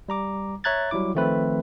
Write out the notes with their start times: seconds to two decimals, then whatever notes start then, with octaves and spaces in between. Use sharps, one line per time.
0.09 G3 A#5 D6
0.64 C#5 E5 A#5 F#6 G#6 A6
0.91 F#3 G3 E4 D6
1.15 D#3 F3 A3 C4 B4